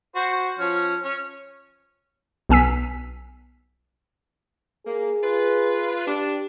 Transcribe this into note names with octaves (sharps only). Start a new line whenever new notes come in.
F#4 C5
F3 C#4
C#4
B1 B3 G#5 E6 B6
A#3 G#4
F4 B4
D4 G4